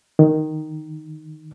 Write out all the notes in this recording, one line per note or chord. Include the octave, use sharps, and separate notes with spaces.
D#3